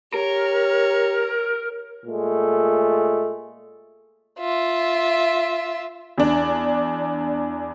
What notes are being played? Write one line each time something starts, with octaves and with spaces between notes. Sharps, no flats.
G4 A#4 C#5
A#2 G#3 A3
F4 E5
E2 D4